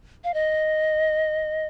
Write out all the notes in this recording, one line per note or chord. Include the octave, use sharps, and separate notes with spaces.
F5
D#5